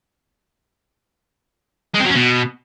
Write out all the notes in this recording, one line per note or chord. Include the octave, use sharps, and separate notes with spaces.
G#3
C4
F#3
C#4
B2